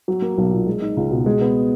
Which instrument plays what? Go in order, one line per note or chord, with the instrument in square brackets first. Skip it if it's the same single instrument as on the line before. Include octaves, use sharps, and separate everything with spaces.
[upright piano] F#3
A#3
B1
A#2
G#3
D#4
C#2
B2
G#3
B3